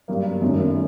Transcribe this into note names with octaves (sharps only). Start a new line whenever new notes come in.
G2 F#3 A#3
F#2 D#3 A3